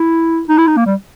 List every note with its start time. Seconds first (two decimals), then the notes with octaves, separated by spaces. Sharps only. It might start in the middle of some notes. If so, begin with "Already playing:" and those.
Already playing: E4
0.49 D#4
0.58 E4
0.68 D#4
0.77 A#3
0.86 G3